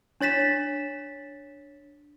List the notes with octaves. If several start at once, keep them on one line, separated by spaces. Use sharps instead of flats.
D4 C#5 A6 B6 E7